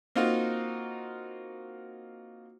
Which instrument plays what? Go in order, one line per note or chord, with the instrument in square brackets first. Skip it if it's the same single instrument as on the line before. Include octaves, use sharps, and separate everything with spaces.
[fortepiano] A#3 C4 D#4 F4 F#4